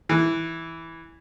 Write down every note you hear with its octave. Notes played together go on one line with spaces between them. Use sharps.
E3